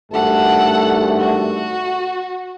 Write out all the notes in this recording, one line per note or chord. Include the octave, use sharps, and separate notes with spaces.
G#1 G2 A3 A4 F#5
F#4